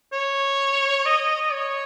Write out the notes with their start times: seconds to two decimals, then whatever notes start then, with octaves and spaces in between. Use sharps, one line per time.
0.12 C#5
1.06 D#5
1.53 C#5